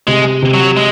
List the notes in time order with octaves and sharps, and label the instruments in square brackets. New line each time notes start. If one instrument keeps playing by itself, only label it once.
[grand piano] C3 [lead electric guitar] G#3
[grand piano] C3
[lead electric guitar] F#3
G#3